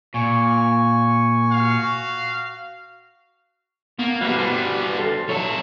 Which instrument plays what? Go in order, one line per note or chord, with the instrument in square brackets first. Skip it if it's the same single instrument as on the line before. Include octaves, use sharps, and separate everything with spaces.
[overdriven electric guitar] A#2 [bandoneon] G#5 C#6
[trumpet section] F#4 F5
[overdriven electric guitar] A#3 [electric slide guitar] B3
[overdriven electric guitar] G3 A#3 [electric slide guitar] F#4 B4 C5
[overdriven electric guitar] D3 G3
[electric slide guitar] A4 C5
[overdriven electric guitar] F#3 A4 [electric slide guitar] C#5